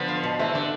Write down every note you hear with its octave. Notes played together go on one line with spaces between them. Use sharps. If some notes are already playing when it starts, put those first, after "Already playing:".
Already playing: D3 F3 B3
F4
B2
C3 E3 A3
D3 D4